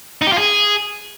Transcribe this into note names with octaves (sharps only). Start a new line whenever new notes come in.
D#4
G4
F4
G#4